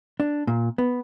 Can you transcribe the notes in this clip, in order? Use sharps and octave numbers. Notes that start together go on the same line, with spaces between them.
D4
A#2
B3